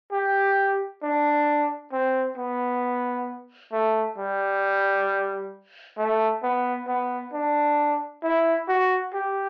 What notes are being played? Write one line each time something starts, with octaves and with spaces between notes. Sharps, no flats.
G4
D4
C4
B3
A3
G3
A3
B3
B3
D4
E4
F#4
G4